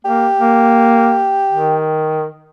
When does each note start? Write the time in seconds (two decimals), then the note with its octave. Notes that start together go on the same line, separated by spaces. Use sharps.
0.05 A#3 G4
0.39 A#3
1.51 D#3